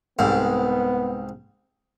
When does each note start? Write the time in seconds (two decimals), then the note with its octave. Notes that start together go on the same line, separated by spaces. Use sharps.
0.19 C2 G#2 B3